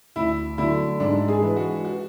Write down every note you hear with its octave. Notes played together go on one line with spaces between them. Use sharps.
D2 E4
D3 F#3 A3 E4
G#2 D4
G#4
E3 G#3
F#4
F#4